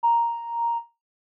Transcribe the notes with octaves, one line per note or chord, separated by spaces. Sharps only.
A#5